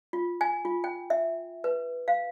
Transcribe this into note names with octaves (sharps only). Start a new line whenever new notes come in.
F4
G#5
F4
G5
E5
B4
F5